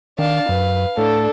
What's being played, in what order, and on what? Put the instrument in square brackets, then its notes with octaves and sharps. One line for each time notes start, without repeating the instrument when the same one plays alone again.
[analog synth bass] D#3 [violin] D4 A5 [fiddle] F5
[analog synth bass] F#2 [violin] B4
[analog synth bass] A2 [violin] D4 [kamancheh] A4